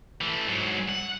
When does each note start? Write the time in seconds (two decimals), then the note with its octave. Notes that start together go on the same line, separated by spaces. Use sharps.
0.21 E3 A3
0.48 G#2 F#3
0.89 F#5